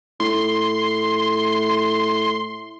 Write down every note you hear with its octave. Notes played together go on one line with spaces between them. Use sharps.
A2 C6